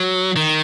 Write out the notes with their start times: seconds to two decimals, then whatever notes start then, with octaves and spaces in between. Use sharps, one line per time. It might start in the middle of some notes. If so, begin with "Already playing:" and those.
Already playing: F#3
0.36 D#3